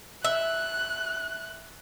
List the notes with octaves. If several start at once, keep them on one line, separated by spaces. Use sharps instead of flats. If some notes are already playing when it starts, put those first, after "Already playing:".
E5 F#6